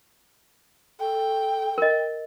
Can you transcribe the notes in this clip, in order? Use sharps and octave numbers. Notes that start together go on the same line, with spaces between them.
A4 G5
A#4 D#5